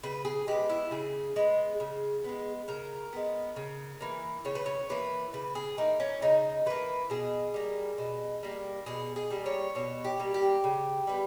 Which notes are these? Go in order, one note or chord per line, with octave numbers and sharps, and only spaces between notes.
C#3 B4
G#4
G#3 B3 G4
E4
C#3 G#4
G#3 B3
C#3
G#3 B3
C#3 A#4
G#3 B3
C#3
E3 A#3
C#3 C#5
B4
C#5
E3 A#3 B4
C#3 B4
G#4
E3 A#3 D#4
C#4
C#3 D#4
E3 A#3 B4
B2 G#4
G3 A#3
B2
G3 A#3
B2 G#4
G#4
G3 A#3
C#5
B2 C#5
G4
G3 A#3
G4
C#3
G3 B3